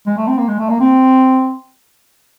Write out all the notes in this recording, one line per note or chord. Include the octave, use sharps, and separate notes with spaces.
G#3
A3
C4
A#3
G#3
A3
A#3
C4